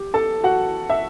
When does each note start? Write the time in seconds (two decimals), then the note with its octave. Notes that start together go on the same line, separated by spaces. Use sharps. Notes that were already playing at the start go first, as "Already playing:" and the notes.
Already playing: G4
0.14 A4 A5
0.44 F#4 F#5
0.90 E5